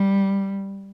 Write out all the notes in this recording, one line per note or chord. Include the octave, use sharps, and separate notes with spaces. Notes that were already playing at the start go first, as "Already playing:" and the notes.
Already playing: G3